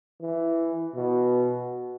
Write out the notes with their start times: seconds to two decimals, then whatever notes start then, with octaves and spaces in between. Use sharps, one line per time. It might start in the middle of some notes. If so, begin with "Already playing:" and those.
0.21 E3
0.95 B2